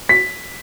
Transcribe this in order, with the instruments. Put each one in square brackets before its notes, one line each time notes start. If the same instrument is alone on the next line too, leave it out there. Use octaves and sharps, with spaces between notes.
[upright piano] B6